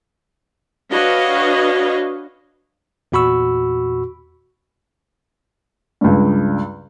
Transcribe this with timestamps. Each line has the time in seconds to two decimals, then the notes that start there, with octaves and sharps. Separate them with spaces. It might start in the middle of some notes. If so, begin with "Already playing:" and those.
0.91 D4 F#4 B4 C#5 D#5 F5
3.12 E2 A#2 F#4 B5 C#6 E6
6.01 C#2 G2